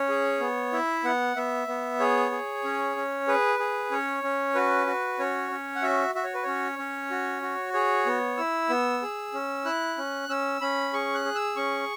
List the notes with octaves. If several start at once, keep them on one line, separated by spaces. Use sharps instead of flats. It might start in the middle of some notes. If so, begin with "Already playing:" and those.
Already playing: C#4 C#5
G#4
B3
E4 E5
B3 F#5
B3 E5
B3
G#4 C#5
G#4
C#4
C#4
G#4 B4
G#4
C#4 C#5
C#4
F#4 B4
F#4
C#4 C#5
C#4
F#5
F#4 E5
F#4 E5
C#5
B4
C#4 C#5
C#4
F#4
F#4
G#4 C#5
B3
E4 E6
B3
G#4
C#4
E4 F#6
C#4
C#4 E6
C#4 B5
G#4 C#6
F#6
G#4
E6
C#4 C#6